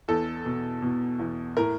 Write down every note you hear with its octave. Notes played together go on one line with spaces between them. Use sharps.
E2 A4
B2
B2
E2
A2 A#4